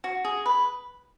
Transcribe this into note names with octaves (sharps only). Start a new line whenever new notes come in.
F#4
G#4
B4